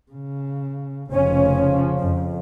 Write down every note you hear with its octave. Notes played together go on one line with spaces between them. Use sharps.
C#3
F1 C#3 F3 C#4
F2